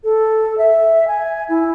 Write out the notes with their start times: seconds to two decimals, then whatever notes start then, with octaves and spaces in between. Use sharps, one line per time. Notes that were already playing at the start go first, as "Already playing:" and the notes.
0.04 A4
0.58 E5
1.08 G#5
1.49 E4